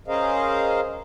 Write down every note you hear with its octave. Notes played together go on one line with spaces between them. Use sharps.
C#4 G#4 A#4 C5 D#5 F5